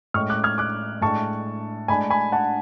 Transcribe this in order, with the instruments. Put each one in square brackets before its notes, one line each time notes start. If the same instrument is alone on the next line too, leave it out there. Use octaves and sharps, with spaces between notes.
[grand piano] A2 G#3 C#4 C#6 F6
D6 F#6
F6 G#6
D6 F#6
A2 G#3 D4 A5 C#6
A2 G#3 D4 G#5 B5
G#5 B5
F#5 A5